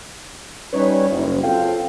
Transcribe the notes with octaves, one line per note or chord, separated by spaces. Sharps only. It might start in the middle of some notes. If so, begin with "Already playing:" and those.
G3 C#4 D#4 B4 C#5
F#1
C4 F4 G#4 A4 F5 G5